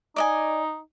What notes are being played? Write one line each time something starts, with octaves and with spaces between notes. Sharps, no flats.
D#4 D5 D#5 G#5